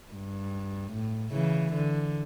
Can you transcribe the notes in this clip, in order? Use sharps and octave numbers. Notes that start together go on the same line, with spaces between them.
G2
A2
C#3 E3
D3